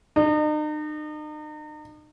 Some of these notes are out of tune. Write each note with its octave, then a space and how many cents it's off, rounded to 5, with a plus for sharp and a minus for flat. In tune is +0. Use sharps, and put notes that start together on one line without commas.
D#4 -40